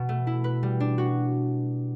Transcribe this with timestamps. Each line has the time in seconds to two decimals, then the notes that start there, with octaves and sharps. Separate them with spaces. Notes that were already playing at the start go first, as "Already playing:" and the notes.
Already playing: B2
0.09 A3
0.27 E4
0.44 B4
0.63 G3
0.80 D4
0.98 F#4